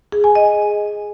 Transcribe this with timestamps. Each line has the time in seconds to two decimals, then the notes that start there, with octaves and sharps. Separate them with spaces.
0.12 G#4
0.24 G#5
0.35 D#5